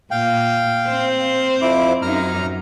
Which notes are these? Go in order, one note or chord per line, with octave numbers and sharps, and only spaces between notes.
A#2 F5 G5
C4 C5
F2 E4 D6
F#2 D#4 A#5 F6